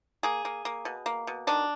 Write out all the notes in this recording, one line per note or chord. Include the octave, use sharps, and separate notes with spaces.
A#3 G#4
A#3
A#3
B2
A#3
B2
D#3 D4